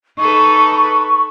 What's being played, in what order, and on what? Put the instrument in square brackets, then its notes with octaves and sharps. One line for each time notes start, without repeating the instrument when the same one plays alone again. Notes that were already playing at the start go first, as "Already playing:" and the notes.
[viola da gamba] D#4 A4 B4 [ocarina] C#6